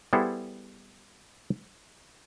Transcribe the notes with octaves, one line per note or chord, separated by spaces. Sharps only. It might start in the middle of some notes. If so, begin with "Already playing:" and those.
G3 B3 E4 G#4 A4 C5